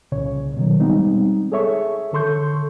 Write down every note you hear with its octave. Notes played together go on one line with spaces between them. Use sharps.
C2 A#2 C#3 C#5
B2 D#3 F#3
G3 G#3 B3 C4 D#4
G#4 A4 C#5 E5 C#6
D3 A4 C6 C#6 G6